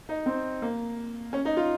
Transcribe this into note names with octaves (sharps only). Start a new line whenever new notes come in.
D#4
C4
A#3
C#4
D#4
F4